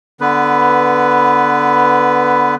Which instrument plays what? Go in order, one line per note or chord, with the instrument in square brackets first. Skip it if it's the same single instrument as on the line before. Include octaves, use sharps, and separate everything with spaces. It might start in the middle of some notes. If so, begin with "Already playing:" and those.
[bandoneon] D3 B3 B4